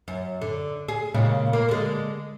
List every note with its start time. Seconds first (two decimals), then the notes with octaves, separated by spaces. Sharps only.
0.08 F#2
0.42 D3
0.88 G#4
1.14 A#2 C#3 G#3
1.53 A#3
1.69 D3 G#3